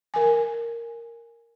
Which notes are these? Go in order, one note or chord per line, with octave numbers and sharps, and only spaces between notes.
A#4 G#5